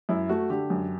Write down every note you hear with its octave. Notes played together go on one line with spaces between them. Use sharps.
F#2 E4
A3 F#4
D3 G4
F#2